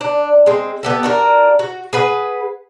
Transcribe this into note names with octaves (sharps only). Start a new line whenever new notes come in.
D4
G#3 C4
B3 G4 A4
D4 F#4 A#4
F#4
G#4 B4 F#5